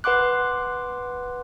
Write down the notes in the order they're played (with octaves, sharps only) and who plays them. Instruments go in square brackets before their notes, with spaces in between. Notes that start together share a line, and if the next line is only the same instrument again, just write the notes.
[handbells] B4 F#5 C6 D6 F#6